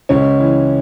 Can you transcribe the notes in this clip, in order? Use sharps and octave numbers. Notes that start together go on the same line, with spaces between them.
C#2 C#4
E3